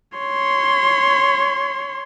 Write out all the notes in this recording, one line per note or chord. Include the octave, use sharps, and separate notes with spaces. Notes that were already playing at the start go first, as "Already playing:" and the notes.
C#5 C6